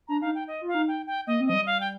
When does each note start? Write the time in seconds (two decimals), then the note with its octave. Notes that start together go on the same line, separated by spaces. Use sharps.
0.08 D4 A#5
0.22 D#4 F5
0.35 G5
0.48 D#5
0.61 F4
0.68 F5
0.74 D#4
0.88 G5
1.07 G5
1.27 A#3 D#5
1.40 C4
1.47 F3 D#5
1.53 G3
1.67 F5
1.80 G5